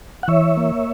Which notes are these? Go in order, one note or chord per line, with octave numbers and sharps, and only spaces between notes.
F#5
E3 C#5 E5
A#3